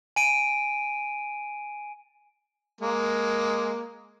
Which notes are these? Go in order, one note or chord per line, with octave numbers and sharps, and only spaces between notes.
G#5 D7 D#7
G#3 A#3